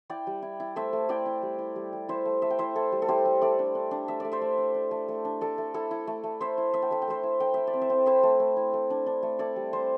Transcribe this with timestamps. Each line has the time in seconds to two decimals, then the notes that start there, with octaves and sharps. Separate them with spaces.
0.09 E4 D5 G5
0.27 G3
0.42 E4
0.60 E4
0.76 A3 C5 E5
0.93 A3
1.09 E4 D5 G5
1.26 E4
1.42 G3
1.59 E4
1.76 G3
1.93 G3
2.09 E4 C5 E5
2.25 A3
2.42 A3 E5
2.50 G5
2.59 E4 C5 E5
2.75 E4 A4
2.92 G3
3.02 A4
3.08 E4 G4 C5
3.25 G3
3.42 A3 A4 D5
3.59 D4
3.75 D4
3.91 D4
4.08 A3 E5
4.20 A3 D5
4.32 C5 E5
4.41 A3
4.58 D4
4.74 D4
4.91 A3
5.08 A3
5.25 D4
5.41 A3 A4 D5
5.58 A3
5.74 E4 A4
5.91 E4
6.07 A3
6.24 A3
6.40 E4 C5 E5
6.58 E4
6.74 A3 E5
6.82 G5
6.91 A3 E5
7.02 G5
7.08 A3 C5 E5
7.23 E4
7.40 A3 G5
7.54 E4 E5
7.67 D5
7.73 C4
7.81 C5 E5
7.90 C4
8.06 E4 C5 E5
8.23 A3
8.40 A3
8.56 E4
8.74 A3
8.90 D4
9.06 D4
9.23 A3
9.39 E4 A4 D5
9.56 G3
9.72 E4 C5 E5